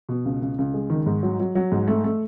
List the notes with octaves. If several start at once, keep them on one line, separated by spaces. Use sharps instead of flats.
B2
C#2
C#2
C#2
G#3
D#3
G#2
F#3
F#3
F#3
G#2
A3
A3